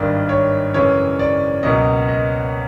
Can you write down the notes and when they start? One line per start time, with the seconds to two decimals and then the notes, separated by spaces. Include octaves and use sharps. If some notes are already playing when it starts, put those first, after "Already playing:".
Already playing: G#1 G2 D#3 D5
0.29 C#5
0.74 F#2 C#3 E3 G#3 C#5
1.19 D5
1.63 C#2 B2 F#3 A#3 D#5
2.09 D#5